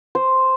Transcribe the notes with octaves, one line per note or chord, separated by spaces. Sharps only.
C5